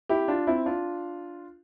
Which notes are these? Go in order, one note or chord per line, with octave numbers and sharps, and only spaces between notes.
E4 G4
D4 F4
C4 E4
D4 F4